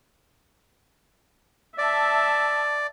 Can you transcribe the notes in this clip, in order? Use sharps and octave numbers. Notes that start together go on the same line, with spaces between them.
D5 E5 A5